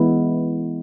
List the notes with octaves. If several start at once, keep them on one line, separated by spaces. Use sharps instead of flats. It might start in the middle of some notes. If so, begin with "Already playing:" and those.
Already playing: E3 G#3 B3 E4